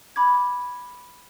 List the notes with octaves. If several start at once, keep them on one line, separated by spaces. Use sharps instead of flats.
B5 D6 G#6